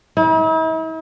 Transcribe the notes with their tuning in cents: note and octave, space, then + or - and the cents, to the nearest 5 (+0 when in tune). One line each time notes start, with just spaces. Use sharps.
E4 -45